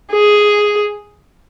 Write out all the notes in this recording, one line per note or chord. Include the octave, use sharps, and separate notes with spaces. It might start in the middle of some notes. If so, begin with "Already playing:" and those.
G#4